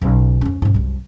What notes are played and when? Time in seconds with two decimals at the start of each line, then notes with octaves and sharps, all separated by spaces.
0.01 B1 C#3
0.41 F2 C#4
0.62 G#2 C#4
0.74 C2 F#2